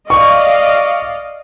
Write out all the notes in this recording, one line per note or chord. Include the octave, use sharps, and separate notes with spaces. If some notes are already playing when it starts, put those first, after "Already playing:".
D5 D#5 F5 C#6